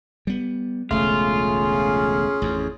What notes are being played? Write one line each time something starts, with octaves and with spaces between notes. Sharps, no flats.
G3 B3
E1 C#2 A3 C#4 F4 G#4
A1 F2